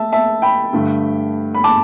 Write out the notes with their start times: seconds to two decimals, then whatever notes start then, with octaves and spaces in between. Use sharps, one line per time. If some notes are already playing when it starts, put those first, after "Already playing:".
Already playing: A3 E5 A5
0.12 E5 A5
0.42 G5 B5
0.73 G2 D3 A3
1.55 B5
1.64 A5 D6